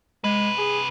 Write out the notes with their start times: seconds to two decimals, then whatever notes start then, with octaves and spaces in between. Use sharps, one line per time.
0.24 C3 G#3 B4
0.58 G#4